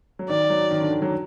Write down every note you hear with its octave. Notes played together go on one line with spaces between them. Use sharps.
F#3
D#3 D5
F#3
D#3
D3
D#3
F#3